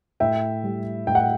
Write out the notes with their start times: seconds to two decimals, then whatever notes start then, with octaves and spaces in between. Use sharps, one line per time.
0.20 A2 E5 G5
0.64 G3
1.07 A2 G5
1.15 F#5